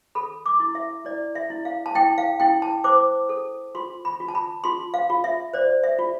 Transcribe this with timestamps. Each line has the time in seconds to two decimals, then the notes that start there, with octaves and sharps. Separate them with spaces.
0.15 A4 B5
0.46 D6
0.60 E4
0.75 E5
1.05 E4 D5
1.35 E5
1.50 E4
1.65 F5
1.86 A5
1.95 E4 G5
2.18 F5
2.40 E4 G5
2.62 A5
2.84 C5 D6
3.29 A4
3.75 F4 C6
4.05 B5
4.20 F4
4.28 A5
4.35 B5
4.64 F4 C6
4.94 F5
5.10 F4
5.24 E5
5.53 C5 D5
5.83 E5
5.99 F4